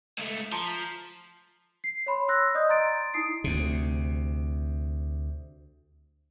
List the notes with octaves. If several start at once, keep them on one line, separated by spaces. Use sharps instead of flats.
C#2 A3
F3 A5 A#5 C6
B6
C7
C#5 B5 C6
C6 E6 F#6 A#6
D5 D#5 D#6 G6
A#5 C6 A6 D7
D#4 E4 D#6 C7 D7
D2 C3